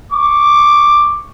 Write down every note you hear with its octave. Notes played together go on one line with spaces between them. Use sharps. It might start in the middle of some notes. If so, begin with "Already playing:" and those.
C#6 D6